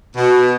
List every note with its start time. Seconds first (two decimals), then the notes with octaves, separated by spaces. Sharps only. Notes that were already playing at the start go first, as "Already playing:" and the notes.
0.15 B2